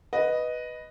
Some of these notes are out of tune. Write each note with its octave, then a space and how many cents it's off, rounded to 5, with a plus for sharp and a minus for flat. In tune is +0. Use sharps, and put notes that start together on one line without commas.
B4 +0 D#5 +0